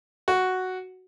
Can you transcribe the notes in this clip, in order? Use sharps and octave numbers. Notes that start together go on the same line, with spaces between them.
F#4